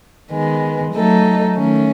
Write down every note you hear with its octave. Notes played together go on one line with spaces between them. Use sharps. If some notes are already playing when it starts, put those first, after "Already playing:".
D#3 G#3 B3
F#3 A3 D#4 A4
D#3 A3 C#4